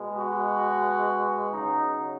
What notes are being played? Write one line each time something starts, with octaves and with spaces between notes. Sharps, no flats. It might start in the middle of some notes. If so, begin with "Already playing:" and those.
Already playing: B2 G#3
F#4
C#3 F#3 D#4